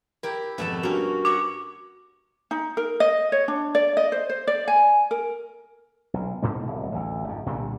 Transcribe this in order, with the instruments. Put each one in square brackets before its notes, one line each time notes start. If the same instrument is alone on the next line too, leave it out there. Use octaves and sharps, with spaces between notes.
[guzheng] E4 G4 [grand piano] A#4
[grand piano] G#1 F2 [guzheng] B2 A3 A5
[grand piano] G2 G4 [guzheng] A#3 C#4 [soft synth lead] F#4
[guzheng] C#5 E5 F#5 [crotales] D6
[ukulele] D#4
A#4
D#5
C#5
D4
D5
D#5
C5
C5
D5
G#5
A#4
[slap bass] B1
G#1 G#2 B2 A#3
D1 C2
A1 D2
G#1 F2
C2 A#2 D3 G3